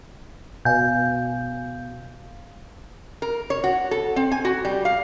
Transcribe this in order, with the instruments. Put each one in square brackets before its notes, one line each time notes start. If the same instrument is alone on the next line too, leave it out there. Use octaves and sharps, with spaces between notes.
[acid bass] B2 [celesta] F5 [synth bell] G#5 G6
[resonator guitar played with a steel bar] A#4
C#5
F#4
A4
C4
G#5
F#4
G3
F5